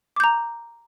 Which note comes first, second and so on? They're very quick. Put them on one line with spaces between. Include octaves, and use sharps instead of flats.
D6 G6 A#5